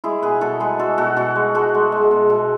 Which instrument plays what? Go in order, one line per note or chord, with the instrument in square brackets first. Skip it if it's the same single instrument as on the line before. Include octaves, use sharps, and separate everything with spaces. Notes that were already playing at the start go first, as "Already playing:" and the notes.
[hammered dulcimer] G#3 E4 G#4
B2 G#4 B4
B2 F#4 A4
G#3 G#4 B4
G#3 F#4 A4
B2 F#4 A4
B2 F#4 A4
G#3
G#3 F#4 A4
G#3
G#3
B2
B2